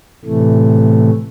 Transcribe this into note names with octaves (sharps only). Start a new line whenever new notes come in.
A2 C3 E3 A3